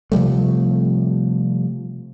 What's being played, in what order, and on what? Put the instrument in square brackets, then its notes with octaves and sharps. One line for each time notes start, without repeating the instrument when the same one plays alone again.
[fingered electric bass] C3 F3 G3 A3